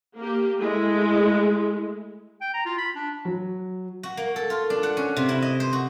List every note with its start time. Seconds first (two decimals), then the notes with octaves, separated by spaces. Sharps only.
0.18 A#3 G4
0.57 G#3 A3 E4
2.41 G5
2.54 A#5
2.65 F4
2.78 B5
2.95 D4
3.25 F#3
4.03 F#4
4.17 A#3
4.36 A4
4.50 F4
4.70 D4
4.83 F#5
4.97 C#4
5.16 C3
5.29 E4
5.42 D#5
5.60 C5
5.73 F#4